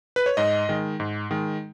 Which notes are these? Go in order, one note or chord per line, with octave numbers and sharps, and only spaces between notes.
B4
C#5
G#2 D#5
D#3 G#3
G#2
D#3 G#3